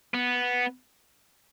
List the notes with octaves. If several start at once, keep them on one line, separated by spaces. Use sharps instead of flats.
B3